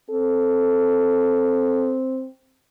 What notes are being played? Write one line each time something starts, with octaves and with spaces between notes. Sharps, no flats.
C4 A4